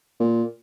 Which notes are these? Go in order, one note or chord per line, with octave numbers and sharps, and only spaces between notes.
A#2